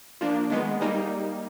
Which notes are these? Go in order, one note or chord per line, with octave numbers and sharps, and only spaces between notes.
F3 A#3 D4
D#3 G#3 B3
G3 A#3 D#4